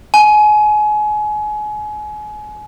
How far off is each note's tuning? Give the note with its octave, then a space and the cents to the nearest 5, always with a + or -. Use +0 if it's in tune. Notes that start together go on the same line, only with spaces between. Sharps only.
G#5 +30